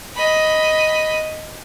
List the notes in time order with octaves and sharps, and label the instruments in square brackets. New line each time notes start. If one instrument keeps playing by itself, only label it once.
[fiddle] D#5 B5